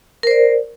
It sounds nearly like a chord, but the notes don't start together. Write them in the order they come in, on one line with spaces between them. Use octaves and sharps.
A#4 C5 D5